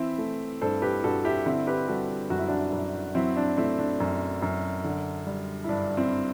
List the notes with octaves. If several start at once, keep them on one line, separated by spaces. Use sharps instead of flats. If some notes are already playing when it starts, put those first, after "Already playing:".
Already playing: E3 C4 E4
A3
G2 A4 C5
G4 B4
G2 F#4 A4
E4 G4
D3 C4 E4
G4 B4
G3 F#4 A4
F#2 F#4
E4
D4 F#4
F#2
F#3 C4 E4
D4
A3 C4 E4
D4
F#2
F#2
D3
G3
E4
G2 D4
C4 E4